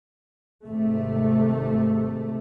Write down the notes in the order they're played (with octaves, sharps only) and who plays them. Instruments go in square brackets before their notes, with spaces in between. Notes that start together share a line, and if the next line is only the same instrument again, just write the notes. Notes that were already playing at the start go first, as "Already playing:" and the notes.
[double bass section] G#1 C3 A3